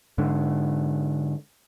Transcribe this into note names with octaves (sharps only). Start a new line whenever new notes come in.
G#2 D3